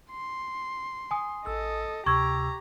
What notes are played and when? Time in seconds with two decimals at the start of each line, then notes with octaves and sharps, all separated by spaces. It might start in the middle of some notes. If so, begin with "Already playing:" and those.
0.10 C6
1.11 G#5 D#6
1.46 A1 A4 D#5 E6
2.06 D2 C3 G4 A#5 C#6 E6 G#6